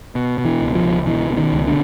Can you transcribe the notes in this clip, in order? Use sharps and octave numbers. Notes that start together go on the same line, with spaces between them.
B2
B2
E3
C#2
F3
C#2
B2 E3
B2
D#3
C#2
D3